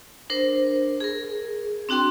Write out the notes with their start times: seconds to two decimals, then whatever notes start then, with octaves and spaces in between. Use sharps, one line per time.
0.30 D4 A#4 C5
1.00 G#4 A#4
1.89 C4 D4 F#4 G5 C6